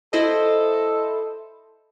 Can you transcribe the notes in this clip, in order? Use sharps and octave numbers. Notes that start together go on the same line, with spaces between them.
E4 A4 C5 D#5